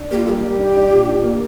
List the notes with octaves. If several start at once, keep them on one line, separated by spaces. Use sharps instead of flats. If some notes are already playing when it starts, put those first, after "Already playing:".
Already playing: D4
A#3 G4
F4
G3 G4 A4
G3
D4
D4
A#2
D4
A#3